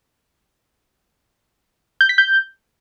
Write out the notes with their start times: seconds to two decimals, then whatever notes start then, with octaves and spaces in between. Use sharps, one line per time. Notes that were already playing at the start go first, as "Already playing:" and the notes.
2.01 G6
2.09 B6
2.18 G6